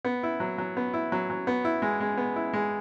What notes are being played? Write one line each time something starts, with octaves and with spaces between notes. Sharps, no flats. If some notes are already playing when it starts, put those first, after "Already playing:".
B3
E4
F#3
F#3
B3
E4
F#3
F#3
B3
E4
G#3
G#3
B3
E4
G#3